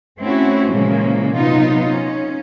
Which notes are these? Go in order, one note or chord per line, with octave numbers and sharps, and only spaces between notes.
A3 C4 C#4 E4 F#4
A#2 C#3 E3 F3 G#3 A#3
C3 F#3 B3 D#4 F4
C#4